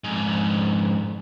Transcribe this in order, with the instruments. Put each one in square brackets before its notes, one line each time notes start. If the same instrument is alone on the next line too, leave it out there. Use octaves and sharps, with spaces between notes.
[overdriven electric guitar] F2 G#2